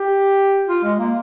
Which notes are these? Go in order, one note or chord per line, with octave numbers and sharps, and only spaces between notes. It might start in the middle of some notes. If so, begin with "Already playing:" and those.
Already playing: G4
F4
G#3
A#3